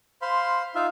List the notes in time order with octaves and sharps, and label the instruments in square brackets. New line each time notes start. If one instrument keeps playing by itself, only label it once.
[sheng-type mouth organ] C5 F5 B5 C6
D#4 F4 E5 F5